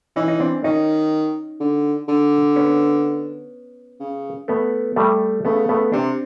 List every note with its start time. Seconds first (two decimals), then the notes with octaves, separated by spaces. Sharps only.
0.16 E3 C#4 D#4
0.28 D#4
0.40 C4 D4
0.64 D#3 C#4 D#4
1.60 D3
2.08 D3
2.56 B3 C#4
4.00 C#3
4.48 A3 B3
4.96 G3 A3
5.45 C#3 A3 B3
5.69 A3 B3
5.92 C3 C4 D4